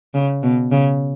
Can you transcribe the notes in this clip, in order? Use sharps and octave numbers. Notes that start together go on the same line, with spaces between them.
C#3
B2
C#3